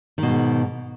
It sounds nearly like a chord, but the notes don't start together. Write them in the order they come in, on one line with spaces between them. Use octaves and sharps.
D#3 B2 G#2